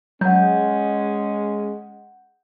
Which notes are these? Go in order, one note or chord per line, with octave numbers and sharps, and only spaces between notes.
F#3 G#3 C#4 F#5 G6